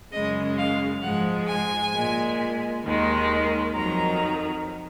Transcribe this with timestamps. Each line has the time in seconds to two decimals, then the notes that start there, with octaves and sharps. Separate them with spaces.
0.13 F#2 C#3 G#3 D#5
0.59 F5
1.03 G#2 F3 G#3 F#5
1.48 G#5
1.94 A#2 G#3
2.84 D#2 D#3 G#3
3.75 F2 D#3 F#3 A#5